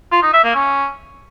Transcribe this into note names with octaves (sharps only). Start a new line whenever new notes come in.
F4
D#4
E5
A#3
C#4